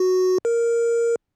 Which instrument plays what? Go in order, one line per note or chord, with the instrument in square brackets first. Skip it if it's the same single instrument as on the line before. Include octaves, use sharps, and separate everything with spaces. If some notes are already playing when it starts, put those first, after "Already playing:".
Already playing: [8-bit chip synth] F#4
A#4